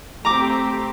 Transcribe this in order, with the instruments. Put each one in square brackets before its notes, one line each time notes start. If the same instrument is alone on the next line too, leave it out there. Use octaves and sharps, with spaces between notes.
[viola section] A3 C4 G4 [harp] A#5 D6